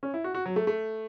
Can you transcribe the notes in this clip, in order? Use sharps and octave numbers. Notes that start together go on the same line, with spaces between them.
C#4
E4
F#4
F#4
F#3
A3
A3